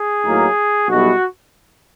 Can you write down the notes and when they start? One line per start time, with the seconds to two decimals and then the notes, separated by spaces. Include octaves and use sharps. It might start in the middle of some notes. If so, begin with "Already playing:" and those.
Already playing: G#4
0.23 A2 F#3 A#3 D#4
0.88 B1 B2 G3 B3 E4 F#4